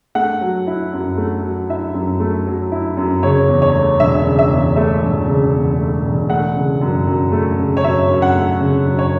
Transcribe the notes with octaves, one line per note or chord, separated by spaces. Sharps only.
A3 F#5
F#3
E4
F#2
A3
F#3
E4 E5
F#2
A3
F#3
E4
F#2
C#3 C#5
E2
C#5
A3
E1 E5
C#3
E5
E2
A3 E5
E1
C#3
E2
A3
E1
A3 F#5
C#3
F#2
F#2
A3
C#3
C#5
F#2 E5
F#2
F#5
A3
C#3
F#2
C#5